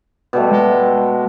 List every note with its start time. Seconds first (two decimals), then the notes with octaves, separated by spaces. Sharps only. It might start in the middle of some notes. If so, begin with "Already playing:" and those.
0.33 B2 G3 A3
0.51 G#3